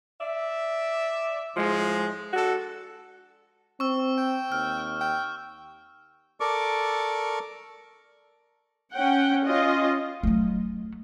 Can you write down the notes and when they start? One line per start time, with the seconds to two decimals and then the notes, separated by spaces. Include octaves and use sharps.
0.20 D5 E5
1.56 A2 F3 G#3
2.33 D4 F#4 A4
3.80 C4 C#6 E6
4.18 G5
4.52 D#2 F6
5.00 G5
6.40 A4 A#4 D5 C#6 D6
8.93 C#4 F#5 G5
9.45 C#4 F4 D#5
10.23 F#3 A3